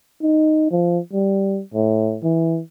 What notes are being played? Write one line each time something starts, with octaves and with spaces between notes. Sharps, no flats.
D#4
F3
G3
A2
E3